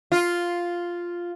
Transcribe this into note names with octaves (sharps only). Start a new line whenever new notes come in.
F4